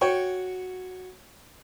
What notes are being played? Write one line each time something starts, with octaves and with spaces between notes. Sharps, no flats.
F#4 C#5 G5 C#6